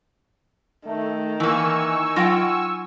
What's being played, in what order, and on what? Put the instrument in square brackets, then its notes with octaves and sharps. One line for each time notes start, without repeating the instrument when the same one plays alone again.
[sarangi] D#3 [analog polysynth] A3
[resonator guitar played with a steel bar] E3 A#3 [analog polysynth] G#5 C#6 E6
[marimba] F#3 A#6 [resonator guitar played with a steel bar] F4 F#5 G5